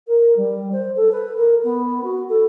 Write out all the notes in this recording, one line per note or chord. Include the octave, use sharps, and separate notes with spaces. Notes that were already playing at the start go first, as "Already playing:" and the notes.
A#4
G3
C5
A4
B4
A#4
B3
F#4
A4